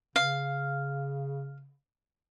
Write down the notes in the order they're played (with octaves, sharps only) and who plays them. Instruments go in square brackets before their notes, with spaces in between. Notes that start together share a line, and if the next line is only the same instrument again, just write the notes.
[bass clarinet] C#3 [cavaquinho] F5